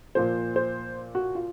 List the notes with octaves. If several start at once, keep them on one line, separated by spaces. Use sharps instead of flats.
A#2 F3 A#3 C5
C5
F#4
F4